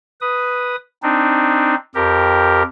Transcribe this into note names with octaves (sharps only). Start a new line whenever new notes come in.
B4 D#6
C4 D4 D#4
F2 G4 A#4